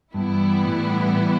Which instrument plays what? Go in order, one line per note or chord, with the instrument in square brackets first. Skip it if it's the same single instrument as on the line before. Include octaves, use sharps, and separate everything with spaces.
[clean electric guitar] G2 [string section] E3 G3 B3 E4
[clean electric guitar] A2